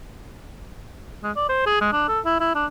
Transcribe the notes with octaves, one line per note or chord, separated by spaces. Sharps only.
G#3
D5
C5
G#4
G#3
D4
A4
E4
E4
D4